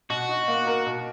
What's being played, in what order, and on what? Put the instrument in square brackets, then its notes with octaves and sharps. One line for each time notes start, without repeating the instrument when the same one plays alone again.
[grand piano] B2 [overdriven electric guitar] F#4
[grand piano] D#4
A#3
A#4
B2